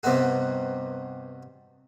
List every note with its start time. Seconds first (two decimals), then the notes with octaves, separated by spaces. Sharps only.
0.03 G2 C3 B3 D#4 F#4